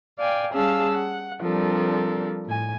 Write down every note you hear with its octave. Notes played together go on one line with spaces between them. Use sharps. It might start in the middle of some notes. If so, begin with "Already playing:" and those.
D5 F5 G5 G#5
G3 C#4 G#4 F5 A5 E6
F#5
F3 G3 C4 D4 A4 A#4
A2 G#5